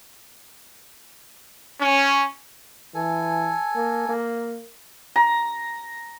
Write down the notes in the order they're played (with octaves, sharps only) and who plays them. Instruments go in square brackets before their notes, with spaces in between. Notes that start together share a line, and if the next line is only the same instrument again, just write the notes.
[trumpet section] C#4
[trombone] E3 [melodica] A4 G#5
[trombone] A#3
A#3
[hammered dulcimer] A#5